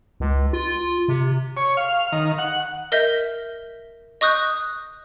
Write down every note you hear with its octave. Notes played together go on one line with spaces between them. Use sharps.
C#2
F4
C3
C#5
F5
D#3
F#5
A#4 D#5 E5 G6
D#5 C#6 D#6 F#6 G6